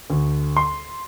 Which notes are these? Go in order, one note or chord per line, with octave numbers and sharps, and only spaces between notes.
D2
C6